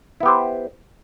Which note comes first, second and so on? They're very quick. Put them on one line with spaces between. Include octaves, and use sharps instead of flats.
E4 B3 G4 C5